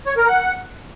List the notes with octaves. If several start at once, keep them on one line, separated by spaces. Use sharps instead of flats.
C#5
A#4
F#5